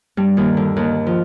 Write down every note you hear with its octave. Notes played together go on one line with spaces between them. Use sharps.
G2 G3
D#2 D#3
D3
D#2 D#3
F3